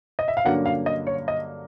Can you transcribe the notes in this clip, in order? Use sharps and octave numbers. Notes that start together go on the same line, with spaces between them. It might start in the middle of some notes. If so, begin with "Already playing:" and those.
D#5
E5
F5
G2 D3 F#3 A#3 C#4 F#5
F5
D#5
C#5
D#5